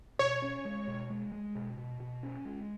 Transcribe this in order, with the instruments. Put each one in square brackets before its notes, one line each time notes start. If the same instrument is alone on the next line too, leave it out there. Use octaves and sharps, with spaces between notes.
[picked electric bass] B2 [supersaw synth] C#5
[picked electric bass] C#4
G#3
B2
G#3
G#3
B2
B2
B2
C#4
G#3